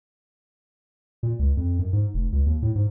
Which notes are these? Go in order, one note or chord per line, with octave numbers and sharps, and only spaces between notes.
A#2
C#2
F2
F#2
G#2
F1
C#2
D#2
A2
G#2